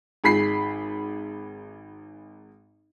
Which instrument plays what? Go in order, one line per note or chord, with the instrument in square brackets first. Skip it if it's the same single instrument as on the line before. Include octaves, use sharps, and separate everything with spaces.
[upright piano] G#1 G#4 B5 B6 C7